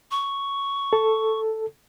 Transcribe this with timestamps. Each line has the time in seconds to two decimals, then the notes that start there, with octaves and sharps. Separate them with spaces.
0.11 C#6
0.93 A4